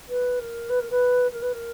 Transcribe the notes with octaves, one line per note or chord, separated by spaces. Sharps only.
B4
A#4
B4
A#4
B4
A#4
B4
A#4